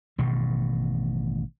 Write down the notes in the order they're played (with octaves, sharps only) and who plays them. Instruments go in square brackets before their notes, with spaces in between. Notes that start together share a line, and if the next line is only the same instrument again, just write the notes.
[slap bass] A1 G2 B2 D#3